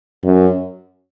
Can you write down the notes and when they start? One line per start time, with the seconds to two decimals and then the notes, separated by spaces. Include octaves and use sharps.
0.24 F#2